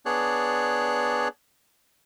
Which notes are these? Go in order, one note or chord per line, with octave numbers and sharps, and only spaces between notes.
B3 D4 G#4 C#5 D5 F#6